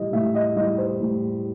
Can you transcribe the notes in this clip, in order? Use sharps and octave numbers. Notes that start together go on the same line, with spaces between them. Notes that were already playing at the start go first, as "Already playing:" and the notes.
Already playing: A2 E3 G3 D#5
A2 E5
D#5
E3 G3 D#5
C5
A2